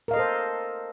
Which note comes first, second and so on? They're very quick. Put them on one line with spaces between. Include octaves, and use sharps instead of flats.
A#4 F5 D#5 A4 C5